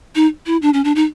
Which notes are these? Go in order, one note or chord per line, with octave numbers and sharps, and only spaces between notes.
D#4
E4
D4
C#4
D4
D#4